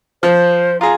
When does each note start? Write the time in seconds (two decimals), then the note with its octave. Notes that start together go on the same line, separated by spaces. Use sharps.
0.23 F3 C5
0.81 F4 G#4 A#5